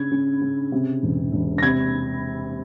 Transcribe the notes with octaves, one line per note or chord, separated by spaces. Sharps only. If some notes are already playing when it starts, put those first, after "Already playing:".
Already playing: C#3 G#6
C#3
C#3
C3
E1
E1
A#6
C3 G#6